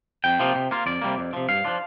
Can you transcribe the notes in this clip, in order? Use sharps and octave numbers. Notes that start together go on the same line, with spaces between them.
F2 G5
C3 F3 A#3 F4
C3
A#3 F4
F2 D5
C3 G3 A#3
F2
C3 F3
G2 F5
F3 D4 F4